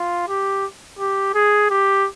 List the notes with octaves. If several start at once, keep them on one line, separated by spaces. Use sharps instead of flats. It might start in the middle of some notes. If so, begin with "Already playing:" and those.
Already playing: F4
G4
G4
G#4
G4